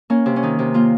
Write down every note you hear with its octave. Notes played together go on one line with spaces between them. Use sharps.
A#3 C#4
C3
C#4
D#3 D#4
C3
A#3 F4